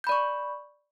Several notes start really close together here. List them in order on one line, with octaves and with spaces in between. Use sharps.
G6 B5 D5 C#6